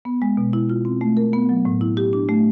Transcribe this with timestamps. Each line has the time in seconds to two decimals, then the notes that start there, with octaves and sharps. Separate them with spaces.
0.05 B3
0.22 G#3
0.37 B2
0.53 E4
0.70 F4
0.85 C4
1.01 A3
1.17 A#4
1.33 B3
1.49 F#3
1.65 A2
1.81 E4
1.97 G4
2.13 D4
2.29 A3